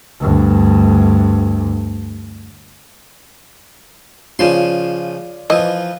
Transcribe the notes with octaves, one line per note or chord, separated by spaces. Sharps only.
D2 G2
C#3 F3 F4 D5 C6 E7
E3 F3 D#5